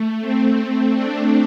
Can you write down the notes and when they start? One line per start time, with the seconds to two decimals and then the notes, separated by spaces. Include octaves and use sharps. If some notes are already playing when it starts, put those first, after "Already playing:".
Already playing: A3
0.21 C4
0.57 C4
0.94 D4